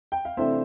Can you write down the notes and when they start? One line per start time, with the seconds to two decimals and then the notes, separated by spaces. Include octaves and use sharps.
0.12 G5
0.25 F5
0.37 C3 E3 A3 D4 C5 E5